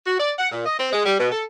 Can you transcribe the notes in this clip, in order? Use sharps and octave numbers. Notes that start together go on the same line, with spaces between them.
F#4
D5
F#5
A#2
D#5
C4
G#3
G3
B2
A4